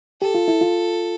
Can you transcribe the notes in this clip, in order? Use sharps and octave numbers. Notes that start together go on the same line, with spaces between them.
G4 A4
F4
E4
F4